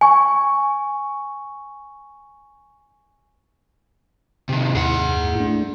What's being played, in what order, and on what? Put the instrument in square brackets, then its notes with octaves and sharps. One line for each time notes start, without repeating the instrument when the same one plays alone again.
[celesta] G#5 C#6
[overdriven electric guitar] C3 D#3
[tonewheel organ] D#2 G#2 E4 [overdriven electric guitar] G#4 F#5
[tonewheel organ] A3 D4